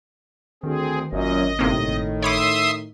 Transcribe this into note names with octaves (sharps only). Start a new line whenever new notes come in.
D2 D#3 C4 G#4
G#1 F#2 A#2 D#5
G1 A2 C3 D#3 A#3
C#5 E5 B5 C6 D6 D#6